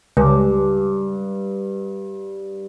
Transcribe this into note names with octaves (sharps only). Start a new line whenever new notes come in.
C#2 G2